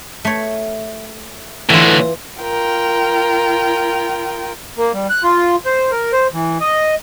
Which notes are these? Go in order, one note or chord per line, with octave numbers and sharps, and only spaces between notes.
A3 C#5
A2 D3 E3 F4
F4 A#4 G5
A#3
G3
F#6
F4
C5
A#4
C5
E3
D#5